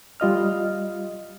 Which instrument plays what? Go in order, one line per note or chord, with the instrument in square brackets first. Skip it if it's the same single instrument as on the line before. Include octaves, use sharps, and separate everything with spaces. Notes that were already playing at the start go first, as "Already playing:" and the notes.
[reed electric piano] G3 F4 D#5 F6